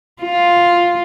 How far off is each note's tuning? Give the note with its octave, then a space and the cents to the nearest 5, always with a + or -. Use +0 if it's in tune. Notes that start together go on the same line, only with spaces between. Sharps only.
F4 +0